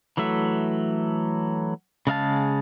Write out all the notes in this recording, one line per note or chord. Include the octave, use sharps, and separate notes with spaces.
E3 F#3 A3 E5
C#3 G#3 F5 A5